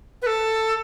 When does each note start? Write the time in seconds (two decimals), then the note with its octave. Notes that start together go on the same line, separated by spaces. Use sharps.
0.22 B4
0.26 A4